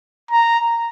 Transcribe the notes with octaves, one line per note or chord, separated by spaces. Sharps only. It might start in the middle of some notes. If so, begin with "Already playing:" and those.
A#5